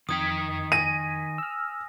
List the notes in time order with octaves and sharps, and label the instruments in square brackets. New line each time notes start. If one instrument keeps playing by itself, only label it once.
[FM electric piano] F2 G#6 B6 [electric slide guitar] D#3 D#4 G5 [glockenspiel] D#6
[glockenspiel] G#5 A#6 [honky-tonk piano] D#7
[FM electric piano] E6 F6